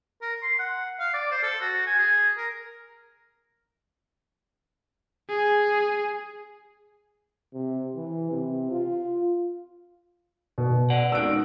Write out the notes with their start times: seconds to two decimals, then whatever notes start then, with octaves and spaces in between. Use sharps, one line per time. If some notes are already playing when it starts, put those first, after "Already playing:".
0.22 A#4
0.42 C6
0.59 F#5
1.00 F5
1.14 D5
1.31 C5
1.43 A4
1.61 F#4
1.86 G#5
1.99 G#4
2.37 A#4
5.30 G#4
7.54 C3
7.96 E3
8.31 C3
8.71 F4
10.58 B2
10.90 D5 F#5
11.12 C#2 B2 D#3 E6 F#6 D7